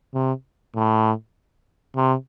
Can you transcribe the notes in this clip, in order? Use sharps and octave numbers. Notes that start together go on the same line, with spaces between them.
C3
A2
C3